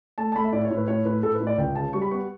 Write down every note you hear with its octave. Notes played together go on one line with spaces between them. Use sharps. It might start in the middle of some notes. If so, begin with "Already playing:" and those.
A3 A5
A5
A3 B5
E5
A2 D5
C#5
A2
B4
A2 C#5
A2 B4
A2 A4
B4
A2
D5
C#2 G5
C#3 A5
G3 C#6
B5
B3 C#6